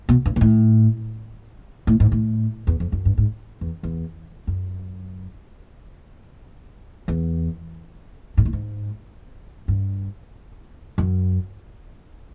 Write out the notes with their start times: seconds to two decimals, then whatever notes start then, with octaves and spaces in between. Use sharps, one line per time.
0.09 B2
0.26 G2
0.36 A#2
0.41 A2
1.87 A2
2.00 G#2
2.12 A2
2.67 E2
2.80 F2
2.92 F#2
3.05 G2
3.18 G#2
3.61 E2
3.83 E2
4.47 F#2
7.08 E2
8.37 G#2
8.45 A2
8.53 G#2
9.68 G2
10.98 F#2